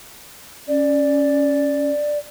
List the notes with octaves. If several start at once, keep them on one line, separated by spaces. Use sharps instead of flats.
C#4 D5